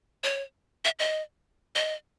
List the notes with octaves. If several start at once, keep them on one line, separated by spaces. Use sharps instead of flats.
C#5
E5
D#5
D#5